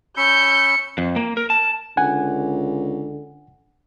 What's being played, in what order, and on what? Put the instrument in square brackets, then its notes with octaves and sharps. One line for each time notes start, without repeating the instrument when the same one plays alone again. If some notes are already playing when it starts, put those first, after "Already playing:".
[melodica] C#4 B5 E6 [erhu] G6 [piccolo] C#7
[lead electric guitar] F2
A#3
A#4
A5
[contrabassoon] C#2 [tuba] D3 [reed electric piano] F#5 G#5